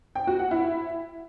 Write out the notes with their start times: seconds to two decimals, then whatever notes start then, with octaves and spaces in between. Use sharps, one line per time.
0.15 G5
0.27 F#4
0.39 F#5
0.51 E4